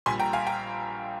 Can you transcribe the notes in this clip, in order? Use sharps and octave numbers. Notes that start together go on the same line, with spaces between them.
A#1 A#2 G3 G#5 C6
G5 A#5
F5 G#5
G5 A#5